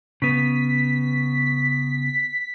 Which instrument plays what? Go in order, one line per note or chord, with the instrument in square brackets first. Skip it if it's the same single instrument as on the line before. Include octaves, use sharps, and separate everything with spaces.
[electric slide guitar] C#3 B3 [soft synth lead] B6